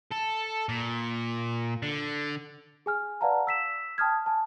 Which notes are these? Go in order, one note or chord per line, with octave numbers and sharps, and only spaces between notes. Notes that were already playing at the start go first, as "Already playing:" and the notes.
A4
A#2
D3
G#4 G#5 F6
B4 D5 F5 F#5 A5 A#5
E6 B6 E7
G5 A5 D#6 F6 G#6
G#5 A5